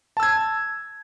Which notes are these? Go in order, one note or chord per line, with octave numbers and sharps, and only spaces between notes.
A5 E6 G#6